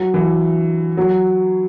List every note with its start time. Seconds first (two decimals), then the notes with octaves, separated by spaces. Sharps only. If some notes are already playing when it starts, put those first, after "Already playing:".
Already playing: F#3
0.14 E3
0.97 F#3